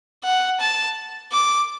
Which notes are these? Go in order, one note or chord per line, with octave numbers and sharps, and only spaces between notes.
F#5
A5
D6